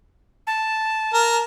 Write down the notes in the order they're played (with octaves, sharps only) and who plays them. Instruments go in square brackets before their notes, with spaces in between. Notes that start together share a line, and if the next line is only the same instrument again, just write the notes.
[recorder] A5
[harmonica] A#4